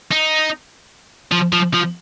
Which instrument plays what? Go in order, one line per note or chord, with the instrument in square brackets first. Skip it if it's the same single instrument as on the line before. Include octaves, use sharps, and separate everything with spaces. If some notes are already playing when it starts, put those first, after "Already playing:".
[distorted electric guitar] D#4
F3
F3
F3